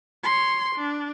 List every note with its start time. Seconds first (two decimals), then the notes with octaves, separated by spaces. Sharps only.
0.24 C#5 C6
0.75 D4